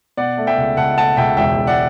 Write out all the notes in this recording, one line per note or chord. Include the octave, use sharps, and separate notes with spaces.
B2 D5 F#5
A3
E5 G5
C#2
C#2 F#5 A5
A3 F#5 A5
C#2 E5 G5
E1 E5 G5
E1
D5 F#5